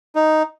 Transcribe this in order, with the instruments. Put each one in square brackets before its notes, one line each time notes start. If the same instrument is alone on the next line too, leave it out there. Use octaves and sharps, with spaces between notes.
[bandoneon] D#4